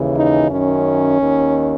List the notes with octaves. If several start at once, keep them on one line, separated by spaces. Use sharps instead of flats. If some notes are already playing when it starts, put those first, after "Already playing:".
Already playing: D#2 C#3 E3
D#4
F#2 D#3 C#4
D#2 D#3